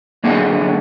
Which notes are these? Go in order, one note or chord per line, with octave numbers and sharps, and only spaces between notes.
F#2 D3 A#3 G#4